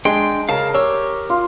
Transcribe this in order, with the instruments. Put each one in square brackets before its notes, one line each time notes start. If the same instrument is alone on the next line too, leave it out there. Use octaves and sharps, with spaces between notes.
[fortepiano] G#3 [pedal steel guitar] D4 G5 C6
[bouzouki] C#3 [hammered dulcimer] A#4 [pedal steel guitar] F5 A5
[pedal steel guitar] G4 [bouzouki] C#5 [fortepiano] E6
[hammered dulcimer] F4